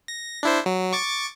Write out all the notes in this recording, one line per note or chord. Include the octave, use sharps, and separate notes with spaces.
A#6
D4 E4 C5
F#3
C#6 D6 A6